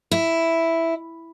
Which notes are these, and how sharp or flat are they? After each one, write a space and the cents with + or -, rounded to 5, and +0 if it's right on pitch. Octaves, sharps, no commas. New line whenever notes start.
E4 +0